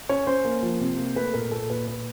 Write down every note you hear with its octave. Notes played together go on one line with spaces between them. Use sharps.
C#4 C#5
C#4 C5
A#3
F3
C3
A#3
A3 B4
A#2 A#4
A#2 A4
A#2 B4
A#2 B4